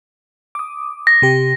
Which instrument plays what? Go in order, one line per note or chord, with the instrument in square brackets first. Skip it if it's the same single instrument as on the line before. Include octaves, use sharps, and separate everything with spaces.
[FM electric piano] D6 D#6
[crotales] A#6
[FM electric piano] C3 G4